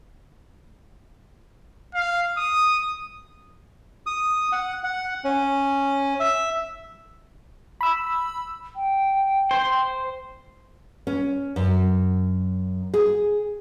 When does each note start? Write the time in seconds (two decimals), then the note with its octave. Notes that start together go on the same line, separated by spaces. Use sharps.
1.94 F5
2.37 D#6
4.06 D#6
4.52 F#5
4.84 F#5
5.24 C#4
6.20 E5
7.81 B5 E6
8.76 G5
9.51 C5
11.07 C#4
11.56 F#2
12.94 G#4